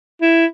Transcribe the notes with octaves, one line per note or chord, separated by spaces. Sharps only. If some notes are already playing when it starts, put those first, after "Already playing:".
E4